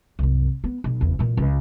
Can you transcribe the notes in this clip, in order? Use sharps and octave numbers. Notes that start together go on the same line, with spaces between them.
C2 F#2
B3
B1
F#1 E2
A#2 E3
C#2 F4